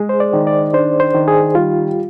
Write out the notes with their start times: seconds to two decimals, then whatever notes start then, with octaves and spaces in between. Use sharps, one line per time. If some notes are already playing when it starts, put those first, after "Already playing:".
Already playing: G#3 G#4
0.09 C5
0.20 D5
0.33 D#3
0.47 D5
0.73 D4 C5
1.00 C5
1.14 D#3
1.28 G#4
1.54 G3 F4